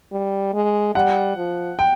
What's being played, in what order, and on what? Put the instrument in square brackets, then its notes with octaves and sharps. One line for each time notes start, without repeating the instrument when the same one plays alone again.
[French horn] G3
G#3
[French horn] G3 [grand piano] F#5
[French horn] F3
[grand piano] G5